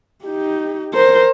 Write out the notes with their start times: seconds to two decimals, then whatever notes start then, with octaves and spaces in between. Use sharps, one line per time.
0.25 D#4 G4
0.94 A#4 C5